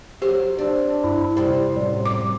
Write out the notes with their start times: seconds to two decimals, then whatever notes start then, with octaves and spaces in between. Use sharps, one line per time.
0.22 F#3 G4 C5
0.59 C4 D4
1.04 G2 E4
1.37 C3 G3 C4
1.76 F#2 A2 G3
2.06 D6